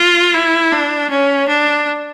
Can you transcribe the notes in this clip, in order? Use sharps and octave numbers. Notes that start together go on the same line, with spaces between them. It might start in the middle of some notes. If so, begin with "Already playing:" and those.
Already playing: F4
E4
D4
C#4
D4